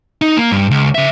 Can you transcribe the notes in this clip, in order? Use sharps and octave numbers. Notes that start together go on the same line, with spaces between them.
D#4
A#3
G2
C#2
C#3 E5